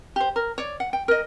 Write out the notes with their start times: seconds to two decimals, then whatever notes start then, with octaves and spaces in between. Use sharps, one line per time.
0.16 G4 C5
0.36 A#4
0.58 C#5 D5
0.80 F#5
0.93 G5
1.08 A#4 D#5